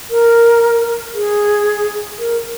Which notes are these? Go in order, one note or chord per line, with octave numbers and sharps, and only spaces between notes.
A#4
G#4
A#4